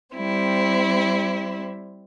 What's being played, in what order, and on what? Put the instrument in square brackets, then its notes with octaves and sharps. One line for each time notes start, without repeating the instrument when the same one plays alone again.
[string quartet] G3 C4 E4